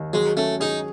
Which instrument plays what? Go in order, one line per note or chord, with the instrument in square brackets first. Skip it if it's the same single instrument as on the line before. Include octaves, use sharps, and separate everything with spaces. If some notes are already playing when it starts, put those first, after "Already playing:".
Already playing: [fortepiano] D#2
[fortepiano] F#3 [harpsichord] G#3
[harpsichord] A3 [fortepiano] C#4
[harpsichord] D#4 [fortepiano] G#4